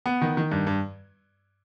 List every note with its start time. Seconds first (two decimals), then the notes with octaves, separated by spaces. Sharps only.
0.06 B3
0.21 D#3
0.37 D#3
0.51 G2
0.67 G2